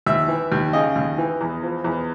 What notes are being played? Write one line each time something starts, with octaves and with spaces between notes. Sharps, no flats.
D#2 E5
E3
D#2
C#3 D#5
D#2
E3
E2
F3
E2